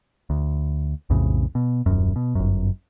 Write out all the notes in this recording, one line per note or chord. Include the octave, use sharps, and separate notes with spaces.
D2
B1 F2 A2 C#3
B2
D#1 F#2
B2
G1 F#2